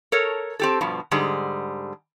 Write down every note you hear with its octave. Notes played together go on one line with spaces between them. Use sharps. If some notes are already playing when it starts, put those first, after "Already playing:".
A4 A#4 C#5
C4 G4 A4
G2 B2 F3
G#2 D3 G3 G#4